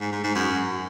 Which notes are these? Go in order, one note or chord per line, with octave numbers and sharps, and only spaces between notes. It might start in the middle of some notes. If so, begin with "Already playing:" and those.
G#2
G#2
G#2
F#2